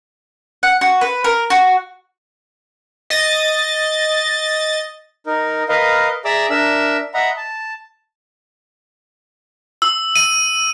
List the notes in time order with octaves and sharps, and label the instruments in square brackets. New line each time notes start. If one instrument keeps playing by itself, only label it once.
[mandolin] F#5
F#4
B4
A#4
F#4
[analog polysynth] D#5 A6
[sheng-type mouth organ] D#4 A#4
A#4 B4 D#5 F5
G#4 D5 E5 A#5 D6 E6
D4 A#4 E5 E6
D#5 E5 F#5 A#5 B5
A5
[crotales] E6
D#7